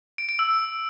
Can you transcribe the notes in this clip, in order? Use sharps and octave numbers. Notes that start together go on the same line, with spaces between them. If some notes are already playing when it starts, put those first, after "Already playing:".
D7
D7
E6